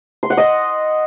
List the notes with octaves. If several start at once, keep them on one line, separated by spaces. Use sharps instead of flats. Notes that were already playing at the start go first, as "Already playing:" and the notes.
C6
F#5
D#5